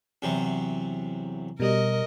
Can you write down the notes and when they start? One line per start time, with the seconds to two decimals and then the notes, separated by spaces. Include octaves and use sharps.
0.22 E2 C3 F#3
1.60 B2 G3 A#4 D#5